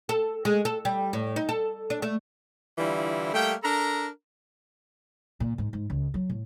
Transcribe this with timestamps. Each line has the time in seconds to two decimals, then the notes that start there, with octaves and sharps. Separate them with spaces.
0.09 A4
0.45 G#3
0.65 A4
0.85 G3
1.13 A2
1.36 D#4
1.49 A4
1.90 D4
2.02 A3
2.78 D3 E3 G3 E4 F4
3.34 G3 A3 A#3 G5
3.63 D4 A4 A#4 A#5
5.40 A#2
5.58 G#2
5.73 G#2
5.90 C#2
6.14 F#3
6.30 A2